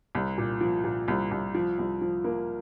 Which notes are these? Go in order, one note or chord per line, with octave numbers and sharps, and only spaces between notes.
C2
A#2
F3
A#2
C2
C2
F3
C2
F3
A#3